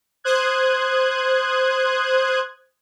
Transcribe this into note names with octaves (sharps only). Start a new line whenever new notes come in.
C5 D#6 F#6 G#6